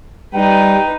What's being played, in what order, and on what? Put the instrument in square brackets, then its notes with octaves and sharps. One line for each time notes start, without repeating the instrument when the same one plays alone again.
[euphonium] G3 [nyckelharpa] D#4 B4 [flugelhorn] G5